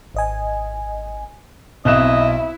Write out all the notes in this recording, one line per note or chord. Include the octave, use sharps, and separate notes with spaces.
G#1 D#5 G#5
B1 C4 E4 D#5 D#6 F#6 E7